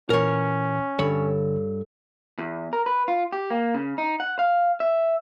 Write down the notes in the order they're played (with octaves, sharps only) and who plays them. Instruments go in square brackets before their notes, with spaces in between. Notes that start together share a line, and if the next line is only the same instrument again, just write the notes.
[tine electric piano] A#2 E3 [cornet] C#4 [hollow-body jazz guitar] A#4 C#5
[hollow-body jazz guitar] G2 C#5 B5 [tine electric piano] D3 [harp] A4 E6
[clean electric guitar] E2
A#4
B4
F4
G4
A#3
C#3
D#4
F#5
F5
E5